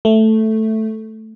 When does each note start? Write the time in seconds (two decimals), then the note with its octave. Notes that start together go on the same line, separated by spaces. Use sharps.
0.05 A3